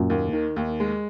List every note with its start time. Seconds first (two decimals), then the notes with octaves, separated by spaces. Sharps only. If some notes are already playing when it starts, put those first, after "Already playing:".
Already playing: F#2 A#2
0.10 D#2
0.33 D#3
0.56 D#2
0.80 G#3